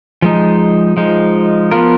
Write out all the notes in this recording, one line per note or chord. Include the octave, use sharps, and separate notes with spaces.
F3 G#3 D#4
F3 G#3 D#4
F3 B3 F4 A#4